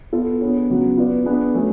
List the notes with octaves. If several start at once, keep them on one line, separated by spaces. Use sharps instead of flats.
B3 F4 A4
B3 D4 G#4 C#5
C#3 F#3 B3 F#4
B3 F4 B4 D5
B3 D4 G#4 B4
F#3 A3 C#4 G#4